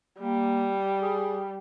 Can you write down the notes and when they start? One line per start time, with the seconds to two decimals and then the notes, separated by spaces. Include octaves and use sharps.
0.20 G3 A#3
1.01 G#4